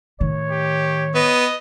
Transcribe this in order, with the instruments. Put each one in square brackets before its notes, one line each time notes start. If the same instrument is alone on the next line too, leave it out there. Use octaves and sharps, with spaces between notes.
[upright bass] A2 D#3 [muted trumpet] C#5
[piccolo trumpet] G4
[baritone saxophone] B3 [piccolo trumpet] D#5